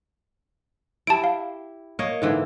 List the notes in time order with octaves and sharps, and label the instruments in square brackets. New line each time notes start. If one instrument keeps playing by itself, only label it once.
[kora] E4 G4 [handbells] A5 D7
[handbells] F5
[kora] A#3 C#5 D#5
G#2 D3 E3